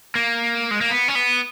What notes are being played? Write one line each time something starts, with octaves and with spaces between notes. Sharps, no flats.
A#3
G#3
A#3
B3
C#4
B3